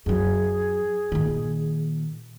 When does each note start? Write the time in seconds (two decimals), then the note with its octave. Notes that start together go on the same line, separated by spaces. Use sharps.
0.06 F#2 F#3 G#4
1.12 A#2 D#3